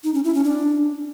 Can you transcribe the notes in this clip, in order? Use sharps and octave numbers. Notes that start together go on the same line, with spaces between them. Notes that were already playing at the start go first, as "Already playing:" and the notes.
D#4
C#4
E4
C#4
D4